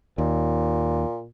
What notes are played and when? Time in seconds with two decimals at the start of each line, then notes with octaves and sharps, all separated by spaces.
0.18 D#2 A#2